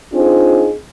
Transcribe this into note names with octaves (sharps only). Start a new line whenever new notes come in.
C4 D4 D#4 F4 G#4 C5